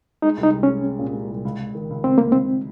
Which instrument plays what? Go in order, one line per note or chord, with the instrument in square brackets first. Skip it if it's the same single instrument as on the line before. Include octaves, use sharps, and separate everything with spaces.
[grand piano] G#3 [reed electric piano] D#4
[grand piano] C2
[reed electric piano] D#4
[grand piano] C2
[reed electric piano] C#4
[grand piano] G#3
G#3
A#2
G#3
C2
C#2
C#2
D#3
C#2
[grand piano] C#2 [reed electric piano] C4
[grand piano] C#2 [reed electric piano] A#3
[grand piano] C#2 [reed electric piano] C4